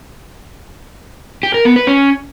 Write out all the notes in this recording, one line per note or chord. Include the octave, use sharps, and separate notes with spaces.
G4
A#4
B3
B4
C#4